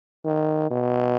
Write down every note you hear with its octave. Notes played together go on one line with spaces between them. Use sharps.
D#3
B2